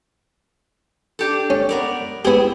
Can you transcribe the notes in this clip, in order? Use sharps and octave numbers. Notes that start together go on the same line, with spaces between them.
D4 G4 A4
C#4
B3 A#4 D5
B3 E4 G4 G#4